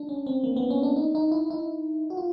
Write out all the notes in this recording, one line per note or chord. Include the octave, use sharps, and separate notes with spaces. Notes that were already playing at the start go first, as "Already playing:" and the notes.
Already playing: D4
C#4
C4
A#3
B3
C#4
D4
D#4
D#4
E4
E4
F#4
F4